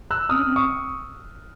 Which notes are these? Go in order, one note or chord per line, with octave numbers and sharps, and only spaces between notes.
E6 F#6
C4 D#6 F6
C#4
C4
C#6 D#6